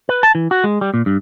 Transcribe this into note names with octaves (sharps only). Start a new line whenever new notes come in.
B4
A5
E3
F#4
G#3
G3
A#2
G2